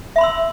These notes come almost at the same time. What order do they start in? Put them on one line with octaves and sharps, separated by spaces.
E5 B5 C6 E6